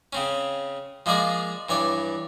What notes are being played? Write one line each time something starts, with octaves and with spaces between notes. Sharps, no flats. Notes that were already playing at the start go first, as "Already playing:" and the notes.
C#3 C4 C#4
F3 G#3 A#3 G#4 D5
G2 E3 C#5 D5